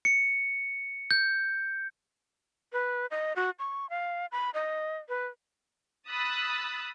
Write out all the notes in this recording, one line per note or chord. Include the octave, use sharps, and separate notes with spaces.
C#7
G6
B4
D#5
F#4
C#6
F5
B5
D#5
B4
B5 D#6 E6 F#6 A6 B6